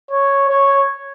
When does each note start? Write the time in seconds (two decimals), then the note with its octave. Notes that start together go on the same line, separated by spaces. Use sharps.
0.11 C#5
0.49 C#5